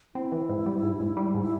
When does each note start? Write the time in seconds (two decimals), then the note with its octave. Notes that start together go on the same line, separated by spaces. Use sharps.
0.15 C4 E4
0.32 E3
0.49 G#2
0.66 G3
0.83 G#2
1.00 G#2
1.17 G3
1.35 G#2
1.42 E4